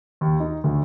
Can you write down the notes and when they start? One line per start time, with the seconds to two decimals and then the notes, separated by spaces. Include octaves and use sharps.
0.21 D#2
0.40 D#4
0.64 D2